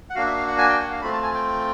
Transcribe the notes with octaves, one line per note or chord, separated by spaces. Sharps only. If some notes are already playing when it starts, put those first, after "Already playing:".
F#5
A#3 D4 F#4 F5
E5
F5
F#5
G#5
G5
F#5
F5
A3 C4 F4 B5
A5
G#5
G5